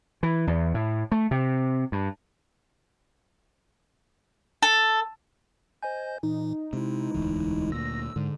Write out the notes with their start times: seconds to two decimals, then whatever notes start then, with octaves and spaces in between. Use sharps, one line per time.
0.23 E3
0.47 E2
0.74 A2
1.12 A3
1.31 C3
1.92 G2
4.62 A4
5.82 C5 D#5 G#5 G6
6.23 A#2 E3 D#4
6.73 C3 G#3 E4
7.14 E1 D2 E3
7.72 D2 A#2 E6 A#6
8.16 G#2 D3